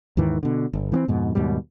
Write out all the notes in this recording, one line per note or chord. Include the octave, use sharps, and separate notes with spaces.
D#2 G#2 D#3 E3
B2 D3
G1
E3 A#3 C4
F2 G#2 B2
D#2 G#2 B2 G3